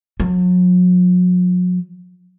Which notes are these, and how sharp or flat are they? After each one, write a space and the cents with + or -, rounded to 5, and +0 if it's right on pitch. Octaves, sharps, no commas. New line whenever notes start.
F#3 -40